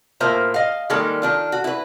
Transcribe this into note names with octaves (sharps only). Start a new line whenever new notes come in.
A2 A#3 F4 C5 E5 A#5
D#5 F5
D#3 G3 G#3 A#3 A4
D#3 D4 F4
F#4
E4 B4